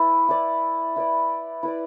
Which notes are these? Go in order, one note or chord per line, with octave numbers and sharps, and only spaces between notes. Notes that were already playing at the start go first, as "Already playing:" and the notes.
Already playing: E4 B4 D5
E4 B4 D5
E4 B4 D5
E4 B4 D5